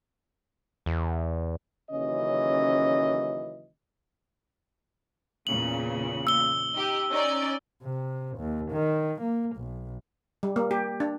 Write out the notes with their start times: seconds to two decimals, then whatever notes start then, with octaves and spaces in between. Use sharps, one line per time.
0.86 E2
1.91 D#2 C#3 E3 F#3 C#4 D#5
5.47 E2 A#2 C#3 F#7
6.27 E6 G7
6.74 D#4 G4
7.09 C#4 D#4 D5
7.83 C3
8.38 D#2
8.72 D#3
9.22 A#3
9.56 B1
10.43 G3
10.56 A#3
10.71 G4
11.00 D4